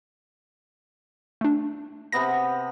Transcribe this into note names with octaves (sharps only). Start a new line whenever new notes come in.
A3 D4
C3 B3 B5 A#6